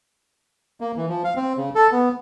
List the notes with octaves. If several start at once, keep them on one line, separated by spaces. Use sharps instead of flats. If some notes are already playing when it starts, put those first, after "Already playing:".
A#3
E3
F3
F5
C4
C#3
A4
B3